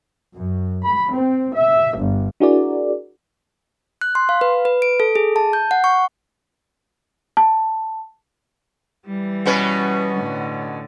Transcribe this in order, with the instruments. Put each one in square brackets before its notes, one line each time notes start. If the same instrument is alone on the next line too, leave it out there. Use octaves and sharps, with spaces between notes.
[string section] F#2
B5
C4
E5
G1
[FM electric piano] D4 E4 F#4 G#4 A#4 D5
[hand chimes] F#6
C6
F5
B4
B4
D7
A4
G#4
A5
G6
F#5
C#6
[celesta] A5
[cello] E3 G3
[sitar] B2 C#4 B4
[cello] A2 D3